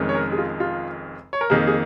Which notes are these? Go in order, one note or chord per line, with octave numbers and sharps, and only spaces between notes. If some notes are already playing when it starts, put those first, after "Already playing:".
Already playing: F1 F2 D#3 G#3 C#4
C#5
A#4
G#4
F4
F4
C#5
A#4
F2 D#3 A#3 G#4
G#4